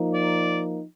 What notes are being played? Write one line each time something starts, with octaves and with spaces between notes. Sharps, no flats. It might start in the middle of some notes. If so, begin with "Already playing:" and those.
Already playing: F3 A#3 D#4
D5